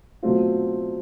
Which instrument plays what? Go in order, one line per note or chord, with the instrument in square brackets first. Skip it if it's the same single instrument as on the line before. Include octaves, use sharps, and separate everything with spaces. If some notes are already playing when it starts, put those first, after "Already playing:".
[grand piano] B2 F#3 A3 C4 F4